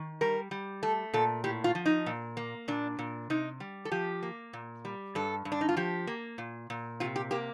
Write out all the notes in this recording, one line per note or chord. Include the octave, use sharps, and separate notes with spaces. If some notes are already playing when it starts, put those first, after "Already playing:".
Already playing: D#3
G3 A#4
G3
A3 A4
A#2 A4
A2 G4
F4
F3
D#4
A#2
A#3
A#2 D4
A#2
C3 D#4
G3
A4
F3 G4
A#3
A#2
G3
G2 A4
G2
D4
D#4
F4
F3 G4
A#3
A#2
A#2
C3 F4
G4
A#3 G4